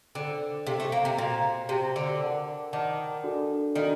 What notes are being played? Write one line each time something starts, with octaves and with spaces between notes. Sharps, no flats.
D3 A4 C5 G5 D6
C3 A4 C5 G5 D6
A3
A#3
C3
A#2 F#4 C5 G5
C3 F#4 C5 G5
D3
A#4 D5 F#5 A5 D6
D#3 A#4 D5 F#5 A5 D6
D4 F#4 A4 D5
D#3 D4 F#4 A4 D5